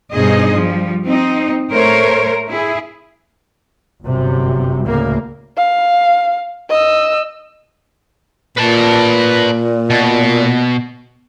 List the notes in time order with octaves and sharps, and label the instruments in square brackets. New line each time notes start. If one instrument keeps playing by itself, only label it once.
[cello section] G2 B2 D#4 G#4 C5 D#5
F3 G3
C4 D#4
A2 A3 A#4 C5 C#5
E4 G#4
[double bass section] G1 F#2 C3
D2 A2 C#3 A#3
[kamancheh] F5
D#5 E6
[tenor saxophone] A#2 [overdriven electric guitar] B4 A5
[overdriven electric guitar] B2